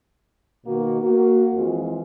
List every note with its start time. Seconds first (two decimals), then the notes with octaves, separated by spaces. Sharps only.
0.65 B2 D#3 A#3 F#4
1.00 A#3 F#4
1.54 F2 E3 G#3 F4